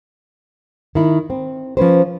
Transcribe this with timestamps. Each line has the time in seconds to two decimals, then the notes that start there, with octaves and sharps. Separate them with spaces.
0.95 D#3 E4
1.30 C4
1.77 F3 C#4 B4 C5